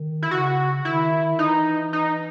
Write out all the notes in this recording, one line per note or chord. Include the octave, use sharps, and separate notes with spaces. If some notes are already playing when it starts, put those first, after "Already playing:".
Already playing: D#3
E4
C#3 F#4
D#3 E4
E3 D#4
D#4